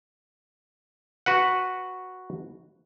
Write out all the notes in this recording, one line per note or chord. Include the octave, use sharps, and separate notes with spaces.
F#4 B4 F#5